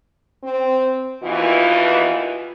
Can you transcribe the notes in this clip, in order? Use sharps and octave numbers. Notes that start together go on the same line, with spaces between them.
C4
D#2 B2 E3 F4